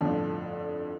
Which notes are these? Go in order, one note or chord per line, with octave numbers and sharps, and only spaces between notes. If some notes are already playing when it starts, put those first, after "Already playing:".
G1 F2 A2 D3 F3